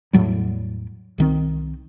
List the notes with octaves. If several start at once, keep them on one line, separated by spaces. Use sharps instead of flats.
E2 A2 F#3 G3
C2 D#3 C4